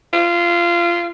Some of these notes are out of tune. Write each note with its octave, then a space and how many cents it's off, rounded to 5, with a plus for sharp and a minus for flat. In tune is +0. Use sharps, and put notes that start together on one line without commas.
F4 -20